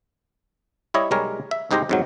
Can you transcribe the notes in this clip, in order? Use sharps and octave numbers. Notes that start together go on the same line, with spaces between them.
G3 E4 C#5 D#5
B1 G3 G#3 A#4 C#5
E5
C2 G#2 D#4 G4 C5 A#5
F2 G#2 F#3